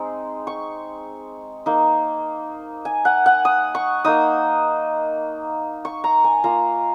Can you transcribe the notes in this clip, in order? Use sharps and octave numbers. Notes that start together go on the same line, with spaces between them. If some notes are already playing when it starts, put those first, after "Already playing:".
Already playing: G#3 C4 D#4
C#6
A#3 D#4
G#5
F#5
F#5
D#6
C#6
A#3 D#4 D#6
C#6
A#5
G#5
A#3 F4 A#5